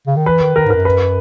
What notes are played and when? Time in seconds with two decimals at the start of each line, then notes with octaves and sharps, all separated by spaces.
0.07 C#3
0.16 D#3
0.26 E3 B4
0.41 D#3
0.55 D#3 A#4
0.66 G#2 A#4
0.75 F#2
0.85 B4